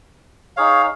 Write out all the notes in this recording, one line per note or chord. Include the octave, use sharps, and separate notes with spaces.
D#4 G#4 C#5 F5